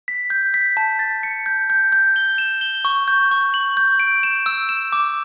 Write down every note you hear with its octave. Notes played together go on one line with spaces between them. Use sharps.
B6
G6
B6
A5
A6
C#7
G6
G6
G6
G7
E7
G7
C#6
G6
C#6
F#7
G6
D7
E7
E6
E7
D6